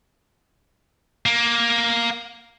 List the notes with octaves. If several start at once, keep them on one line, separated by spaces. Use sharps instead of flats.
A#3